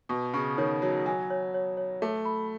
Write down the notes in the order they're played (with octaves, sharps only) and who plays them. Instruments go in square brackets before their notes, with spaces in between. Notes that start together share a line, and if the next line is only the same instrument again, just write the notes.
[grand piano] B2 [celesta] C#6
[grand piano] C#3 [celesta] C#6
[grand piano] D#3 [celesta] C#5
[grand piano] F#3 [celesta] C#5
[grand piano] F#3 [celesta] G#5
[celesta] C#5
C#5
C#5
[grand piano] A3 [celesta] A4
[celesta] B5